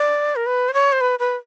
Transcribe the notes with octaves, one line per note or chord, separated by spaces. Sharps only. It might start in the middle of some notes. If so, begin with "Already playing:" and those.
Already playing: D5
A#4
B4
C5
C#5
C5
B4
B4